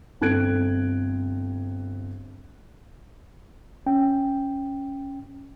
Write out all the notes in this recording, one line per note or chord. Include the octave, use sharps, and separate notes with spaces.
G1 C4 A4 F#6 G#6 D7
C#4 G5